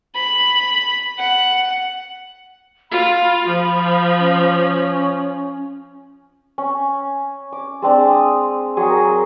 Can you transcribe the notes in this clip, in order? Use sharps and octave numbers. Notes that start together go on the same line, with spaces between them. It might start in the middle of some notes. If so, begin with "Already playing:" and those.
B5
F#5
F4 B5
F3 B5
C#4
C#4
D6
G#3 C4 D4
D#6
F#3 G#4
A#4